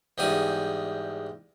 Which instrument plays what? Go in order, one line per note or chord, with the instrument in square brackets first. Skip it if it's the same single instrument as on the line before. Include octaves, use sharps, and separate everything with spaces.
[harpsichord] E2 G#2 G3 G#5